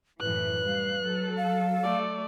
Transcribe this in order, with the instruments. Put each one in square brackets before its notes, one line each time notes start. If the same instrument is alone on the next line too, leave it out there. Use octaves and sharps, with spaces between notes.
[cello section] F#2 A2 E3 [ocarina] B4 [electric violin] F#6
[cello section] G3 F5
F#3 A4
[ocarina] F5
[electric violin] A3 D5